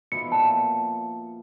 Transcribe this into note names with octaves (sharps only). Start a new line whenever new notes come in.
B2 F3 E4 C#7
A#2 F3 A5